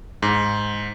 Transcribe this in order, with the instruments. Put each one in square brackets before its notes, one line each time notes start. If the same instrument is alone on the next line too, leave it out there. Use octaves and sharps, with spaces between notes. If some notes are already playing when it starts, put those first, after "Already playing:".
[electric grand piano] G#2